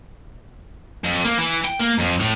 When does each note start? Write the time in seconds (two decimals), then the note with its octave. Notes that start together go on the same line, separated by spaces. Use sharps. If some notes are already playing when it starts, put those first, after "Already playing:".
1.04 F2
1.24 A#3
1.38 E3
1.64 G5
1.80 A#3
1.98 F2
2.20 A2